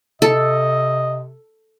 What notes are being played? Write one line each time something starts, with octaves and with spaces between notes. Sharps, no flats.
C3 A4 D#5